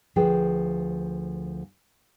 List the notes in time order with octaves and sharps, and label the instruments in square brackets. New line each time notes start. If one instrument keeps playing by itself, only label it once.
[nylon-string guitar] D2 F3 G#4 B4 G5